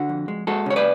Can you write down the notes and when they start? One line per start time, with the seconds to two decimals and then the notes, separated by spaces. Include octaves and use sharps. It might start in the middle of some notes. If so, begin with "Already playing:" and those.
Already playing: D3 F#4
0.09 F2
0.28 G#3
0.47 G#3 F#4 A4
0.66 C#3 C#5
0.76 B4 D5